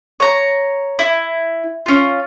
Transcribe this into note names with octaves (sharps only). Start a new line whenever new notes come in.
C#5 A#5
E4
C#4 F4